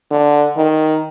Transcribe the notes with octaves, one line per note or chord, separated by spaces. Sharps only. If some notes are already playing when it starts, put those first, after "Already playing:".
D3
D#3